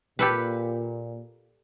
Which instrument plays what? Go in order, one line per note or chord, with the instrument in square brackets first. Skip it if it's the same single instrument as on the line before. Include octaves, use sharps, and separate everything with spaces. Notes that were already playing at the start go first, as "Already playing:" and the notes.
[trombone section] A#2 [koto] G4 A4 B4